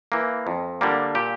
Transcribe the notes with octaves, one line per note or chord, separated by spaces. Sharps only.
E3 A#3
F2
D3 G3 A#3
A#2 G4